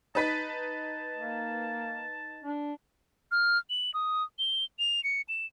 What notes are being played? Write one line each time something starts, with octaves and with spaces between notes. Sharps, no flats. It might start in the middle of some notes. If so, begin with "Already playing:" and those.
D#4 B4 A5 B6
A5
A#3
D4
F6
F#7
D#6
G7
F7
C#7
E7